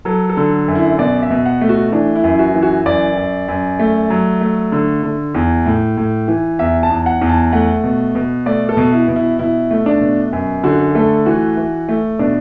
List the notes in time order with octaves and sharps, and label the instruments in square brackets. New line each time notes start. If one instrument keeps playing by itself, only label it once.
[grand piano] F#3 A4
A4
D3
F#2
E4
B2 D5
E5
B2
F#5
A3
F#4
E3 D4
E4
F#2
E4
F#4
E3
F#4
F#2 D5
F#2
F#2
A3
F#3
A3
D3
D3
E2
A2
A2
E3
E2 E5
A5
E2
F#5
E2
A5
A3 F#5
B2
B2
A3 D5
A4
B2
E4
B2
E4
B2 E4
A3
D4
B2
F#2
D3 F#4
A3 A4
E3 F#4
E3
A3
B2 D4